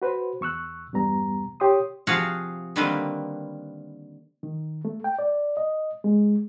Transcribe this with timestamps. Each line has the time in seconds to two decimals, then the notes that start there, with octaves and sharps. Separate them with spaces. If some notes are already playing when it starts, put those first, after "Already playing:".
0.02 F#4 B4 C5
0.41 E2 C#6 E6 F#6
0.93 E2 G2 G3 B3 A#5
1.60 G4 C#5 C6 D#6
2.07 C3 F3 F#4 G#4 F5 F#5
2.76 D3 D#3 G3 A#3 C4 B4
4.43 D#3
4.85 A3
5.04 G5
5.19 D5
5.57 D#5
6.04 G#3